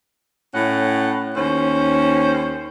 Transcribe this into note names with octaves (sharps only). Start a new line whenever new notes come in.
A2 C#4 F#5
D#2 C#4 C5